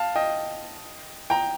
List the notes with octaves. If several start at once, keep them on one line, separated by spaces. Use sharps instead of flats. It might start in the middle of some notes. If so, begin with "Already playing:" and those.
Already playing: F5 A5
D#5 G5
G5 A#5